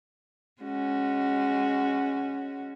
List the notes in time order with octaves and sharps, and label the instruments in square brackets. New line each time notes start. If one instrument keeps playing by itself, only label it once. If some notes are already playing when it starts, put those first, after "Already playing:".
[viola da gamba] G#3 C#4 F#4